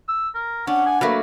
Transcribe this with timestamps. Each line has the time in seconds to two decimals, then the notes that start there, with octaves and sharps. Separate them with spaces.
0.09 E6
0.35 A#4
0.67 C#4 D4 F#5
0.86 G#5
1.01 F#3 A3 A#3 B4